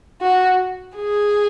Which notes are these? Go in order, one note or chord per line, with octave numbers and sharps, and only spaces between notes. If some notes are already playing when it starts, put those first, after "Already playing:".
F#4
G#4